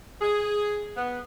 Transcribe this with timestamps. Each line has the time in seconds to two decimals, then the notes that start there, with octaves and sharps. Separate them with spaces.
0.22 G#4
0.96 B3